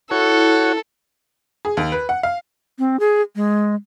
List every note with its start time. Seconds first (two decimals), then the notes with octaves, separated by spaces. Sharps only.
0.11 E4 F#4 A4 C#5
1.65 G#4
1.77 D#2
1.92 B4
2.09 F#5
2.23 F5
2.79 C4
3.00 G#4
3.36 G#3